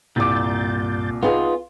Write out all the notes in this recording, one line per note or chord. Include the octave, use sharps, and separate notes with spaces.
C2 G2 A#2 D6 G6 A6
B3 D#4 F4 G#4